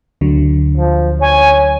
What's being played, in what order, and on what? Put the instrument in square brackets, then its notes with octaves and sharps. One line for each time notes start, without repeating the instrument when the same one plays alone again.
[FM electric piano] D2 D3 F#3
[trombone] F3
[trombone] C#5 [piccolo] G#5